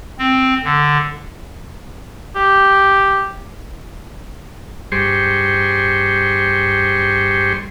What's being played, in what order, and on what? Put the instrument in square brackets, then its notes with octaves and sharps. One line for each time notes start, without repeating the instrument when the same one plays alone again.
[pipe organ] C4
D3
[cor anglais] G4
[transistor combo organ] G2 G3 G#4 C5 C6 C#6